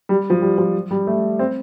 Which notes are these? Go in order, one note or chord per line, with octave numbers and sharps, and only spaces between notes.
G3
F3
G3
F3
G3
A3
C4